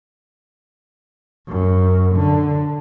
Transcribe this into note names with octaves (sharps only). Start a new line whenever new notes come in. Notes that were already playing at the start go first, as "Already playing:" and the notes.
F#2
D3